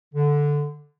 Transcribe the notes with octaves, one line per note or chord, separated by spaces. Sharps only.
D3